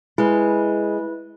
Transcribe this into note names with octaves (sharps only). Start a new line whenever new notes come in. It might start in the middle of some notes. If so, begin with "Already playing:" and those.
G#3 E4 B4